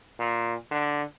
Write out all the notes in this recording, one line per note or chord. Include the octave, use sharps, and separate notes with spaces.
A#2
D3